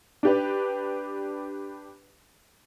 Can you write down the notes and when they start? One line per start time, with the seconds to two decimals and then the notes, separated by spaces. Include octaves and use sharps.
0.23 D4 G4 B4